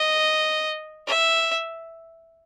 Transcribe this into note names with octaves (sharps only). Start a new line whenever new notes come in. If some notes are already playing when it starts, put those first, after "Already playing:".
Already playing: D#5
E5